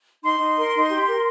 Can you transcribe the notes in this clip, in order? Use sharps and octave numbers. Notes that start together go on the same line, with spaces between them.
D#4 C6
D#4
A#4
D#4
G4
A#4